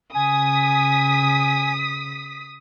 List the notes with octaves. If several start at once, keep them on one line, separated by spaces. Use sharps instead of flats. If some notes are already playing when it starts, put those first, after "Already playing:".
C#3 G#5 D#6 B6